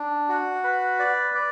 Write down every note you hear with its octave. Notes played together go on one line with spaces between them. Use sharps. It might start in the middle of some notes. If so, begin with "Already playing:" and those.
Already playing: D4
F#4
B4
D5
D5